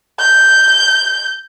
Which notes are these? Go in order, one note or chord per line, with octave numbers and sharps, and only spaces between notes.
G6